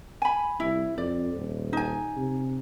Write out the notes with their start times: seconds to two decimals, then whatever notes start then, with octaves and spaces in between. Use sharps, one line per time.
0.22 G#5 B5
0.60 C2 E4
0.98 F2 D5
1.34 D#1
1.73 D#4 G#5
2.16 C3